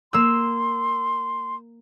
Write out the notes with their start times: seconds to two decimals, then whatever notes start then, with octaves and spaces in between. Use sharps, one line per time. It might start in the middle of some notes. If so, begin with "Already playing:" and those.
0.13 A#3 C6 E6